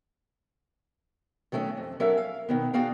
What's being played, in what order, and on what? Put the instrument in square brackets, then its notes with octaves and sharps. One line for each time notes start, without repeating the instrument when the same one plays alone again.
[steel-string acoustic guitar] D#3 F#3 A3 C#4
F2
F#3 C#4 A4 A#4 E5 F#5
F5
B2 D#3 B3
B3 D4 F#4 G#4 F5 G5